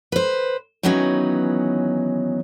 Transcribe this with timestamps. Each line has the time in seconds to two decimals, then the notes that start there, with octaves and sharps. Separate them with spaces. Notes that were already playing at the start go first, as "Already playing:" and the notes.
0.12 B4 C5
0.83 D#3 E3 F#3 B3 C#4 D#4